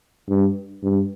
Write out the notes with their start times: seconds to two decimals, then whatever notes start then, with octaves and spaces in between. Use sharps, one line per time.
0.29 G2
0.83 G2